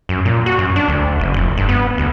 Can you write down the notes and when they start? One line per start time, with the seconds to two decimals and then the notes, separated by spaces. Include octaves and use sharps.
0.09 F#2
0.25 A#2
0.46 F#4
0.58 F#2
0.76 D4
0.88 D2
1.20 F#1
1.34 F1
1.57 G2
1.69 B3
1.98 D2